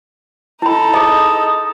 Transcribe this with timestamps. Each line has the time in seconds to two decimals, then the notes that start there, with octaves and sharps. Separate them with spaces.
0.62 D#4 E4 A4 B5
0.94 G#4 D#5 D#6